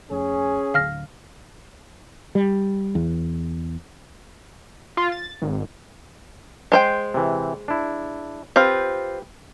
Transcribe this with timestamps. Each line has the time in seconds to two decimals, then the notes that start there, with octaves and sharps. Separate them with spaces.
0.11 F1 C#4 G#4
0.74 D1 D3 F5 F6 A#6
2.35 G3
2.95 E2
4.97 F4
5.12 A6
5.42 G#1
6.72 G#3 C5 G5
7.14 C3 E3
7.68 D4 E4
8.56 C4 F4 G4 B4